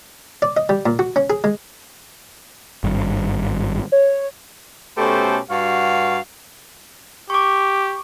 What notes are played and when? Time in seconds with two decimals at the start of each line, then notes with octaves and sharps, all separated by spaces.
0.42 D5
0.57 D#5
0.69 G3
0.86 A#2
0.99 F#4
1.16 C#4
1.30 G#4
1.44 G#3
2.84 G#1 G2
3.92 C#5
4.98 B2 A3 C#4 G4 A4 C5
5.50 G2 F#4 F5
7.30 G4 C#6 D6